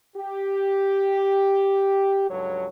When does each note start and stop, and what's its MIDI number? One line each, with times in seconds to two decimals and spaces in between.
0.17 2.30 67
2.30 2.67 37
2.30 2.67 43
2.30 2.67 54
2.30 2.67 69
2.30 2.67 73